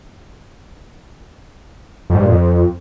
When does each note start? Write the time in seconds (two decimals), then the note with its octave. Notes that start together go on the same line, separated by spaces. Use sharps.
2.10 F2
2.15 G#2
2.20 G2
2.25 A#2
2.30 F2